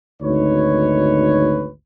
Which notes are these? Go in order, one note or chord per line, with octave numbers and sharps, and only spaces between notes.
G#1 D2 D#4 B4 C#5